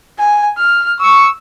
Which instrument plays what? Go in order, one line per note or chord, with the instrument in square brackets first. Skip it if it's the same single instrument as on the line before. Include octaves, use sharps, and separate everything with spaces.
[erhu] G#5
F6
[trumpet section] C#6 [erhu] E6